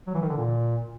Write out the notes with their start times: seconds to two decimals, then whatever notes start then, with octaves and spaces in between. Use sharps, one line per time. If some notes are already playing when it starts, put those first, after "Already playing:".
0.07 F#3
0.14 E3
0.22 D#3
0.29 D3
0.37 A#2